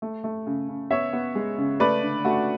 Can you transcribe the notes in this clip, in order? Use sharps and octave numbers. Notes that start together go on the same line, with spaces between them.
A3
A3
C#3
C#3
B3 C#5 E5
B3
G#3
C#3
A3 B4 D5
D3
A3 F#4